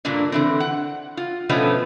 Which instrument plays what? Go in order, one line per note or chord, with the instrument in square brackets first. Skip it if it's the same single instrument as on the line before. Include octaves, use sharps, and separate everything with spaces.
[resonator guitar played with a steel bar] G2 A#2 D3 A#3 D4
D3 E3 C4
F#5
F4
B2 D3 F3 A3 B3 C#4